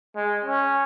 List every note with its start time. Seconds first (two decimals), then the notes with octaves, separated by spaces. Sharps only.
0.16 G#3
0.44 C#4